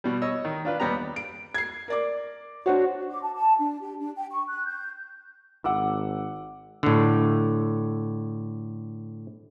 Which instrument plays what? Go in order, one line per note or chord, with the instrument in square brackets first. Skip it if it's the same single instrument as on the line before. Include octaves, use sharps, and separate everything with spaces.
[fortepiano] B2 G3
C#5 D#5 E6
D#3
D4 F4 B4
D#2 G3 B3 G4 A#5
[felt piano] D7
G#6 C7
A#4 D5 D6
[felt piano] D4 C5 C#5 [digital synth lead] F#4
[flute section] D6
A5
A5
D4
G4
D4
G5
C#6
F#6
G6
[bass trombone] G#1 [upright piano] F#5 D6 E6
[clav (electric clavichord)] A2 D3